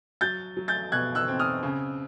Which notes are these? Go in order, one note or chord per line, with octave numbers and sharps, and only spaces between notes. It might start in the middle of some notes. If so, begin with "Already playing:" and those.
F#3 G6 A6
F#3
G6 A6
B2 F#6 G#6
E6 F#6
C4
D#6 F6
C#3